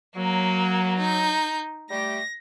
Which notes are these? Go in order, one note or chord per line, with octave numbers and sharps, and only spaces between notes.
F#3 A#3
D#4 G6
G3 A3 G4 A#6